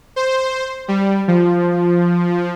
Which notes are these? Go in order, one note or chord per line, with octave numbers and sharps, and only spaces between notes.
C5
G3
F3